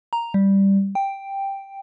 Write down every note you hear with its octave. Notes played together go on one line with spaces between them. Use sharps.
A#5
G3
G5